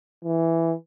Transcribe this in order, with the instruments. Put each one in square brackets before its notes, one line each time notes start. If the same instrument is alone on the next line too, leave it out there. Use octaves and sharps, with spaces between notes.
[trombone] E3